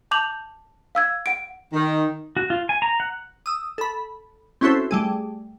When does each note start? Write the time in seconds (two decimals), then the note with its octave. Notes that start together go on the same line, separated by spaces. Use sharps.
0.11 A5 D6 G6 F7 F#7
0.95 F5 E6 G#6
1.26 F#5 D7
1.73 D#3
2.37 F#4
2.50 F4
2.69 G#5
2.82 A#5
3.00 F#5
3.46 D#6 E6
3.78 A4 B5
4.61 C4 C#4 E4 F#4 A4 C5
4.91 G3 A3 G#4